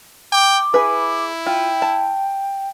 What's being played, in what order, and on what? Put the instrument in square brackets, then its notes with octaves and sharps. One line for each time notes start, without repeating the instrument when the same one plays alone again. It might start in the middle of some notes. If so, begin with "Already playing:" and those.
[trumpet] G5 [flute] D6
[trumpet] E4 [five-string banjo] G#4 B4
[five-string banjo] F4 [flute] G5
[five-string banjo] A5